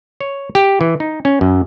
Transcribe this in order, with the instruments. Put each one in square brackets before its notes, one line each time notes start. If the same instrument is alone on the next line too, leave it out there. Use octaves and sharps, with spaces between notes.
[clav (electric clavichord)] C#5
G4
E3
D#4
C#4
F#2